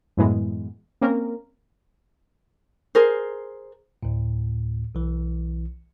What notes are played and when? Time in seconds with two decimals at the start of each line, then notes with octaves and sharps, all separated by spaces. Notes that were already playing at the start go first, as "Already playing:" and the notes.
0.17 F#2 A2 E3 G#3 B3
1.01 A#3 C4 C#4 A#4
2.95 G#4 A#4 C5
4.03 D2 A2
4.95 B1 E3